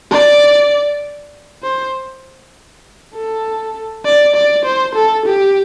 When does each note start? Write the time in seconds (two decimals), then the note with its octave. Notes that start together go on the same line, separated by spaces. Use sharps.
0.11 D5
1.63 C5
3.14 A4
4.05 D5
4.35 D5
4.65 C5
4.95 A4
5.25 G4